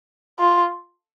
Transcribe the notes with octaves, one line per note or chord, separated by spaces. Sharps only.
F4